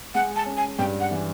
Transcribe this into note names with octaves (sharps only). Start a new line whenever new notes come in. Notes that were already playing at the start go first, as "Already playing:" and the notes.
G#3 F#5
A5
C#4
G#5
G2 G5
F#5
E3